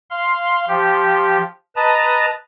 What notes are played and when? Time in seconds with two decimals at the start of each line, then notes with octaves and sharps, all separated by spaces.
0.10 F5 C6
0.68 F3 G4
1.76 B4 D#5 A5 A#5